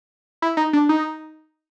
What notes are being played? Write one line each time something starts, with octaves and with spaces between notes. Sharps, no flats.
E4
D#4
D4
D#4